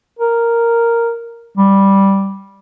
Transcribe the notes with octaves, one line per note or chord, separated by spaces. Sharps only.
A#4
G3